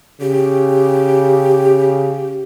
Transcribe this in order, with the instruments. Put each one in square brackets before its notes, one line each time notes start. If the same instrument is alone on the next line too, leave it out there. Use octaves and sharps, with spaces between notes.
[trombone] C#3 [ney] G4